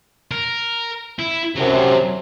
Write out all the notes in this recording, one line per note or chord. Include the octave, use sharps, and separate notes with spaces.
A#4
E4
F#2 C3 F#3 A4